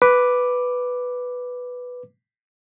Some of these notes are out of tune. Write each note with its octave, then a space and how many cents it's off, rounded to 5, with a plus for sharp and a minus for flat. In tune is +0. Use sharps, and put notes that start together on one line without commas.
B4 +0 D6 +0